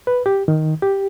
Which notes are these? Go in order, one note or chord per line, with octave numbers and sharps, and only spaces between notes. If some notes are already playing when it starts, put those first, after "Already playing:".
B4
G4
D#3
G4